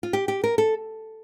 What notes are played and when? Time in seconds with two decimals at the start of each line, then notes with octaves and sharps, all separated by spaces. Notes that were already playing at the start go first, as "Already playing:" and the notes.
0.03 F4
0.13 G4
0.28 G4
0.44 A#4
0.58 A4